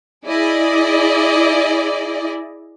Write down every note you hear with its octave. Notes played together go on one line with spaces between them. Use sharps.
E4 G#4 D5 D#5